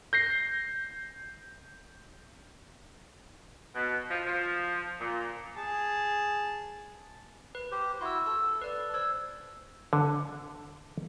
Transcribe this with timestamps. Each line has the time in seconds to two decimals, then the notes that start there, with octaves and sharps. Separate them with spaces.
0.13 G6 A#6 C7
3.75 B2
4.11 F3
4.27 F3
5.01 A#2
5.57 G#4 A5
7.55 B4
7.71 G4 C5
8.01 E4 F#4 C6 E6
8.26 A4 E6
8.62 B4 D5
8.94 C5 E6 G#6
9.93 D3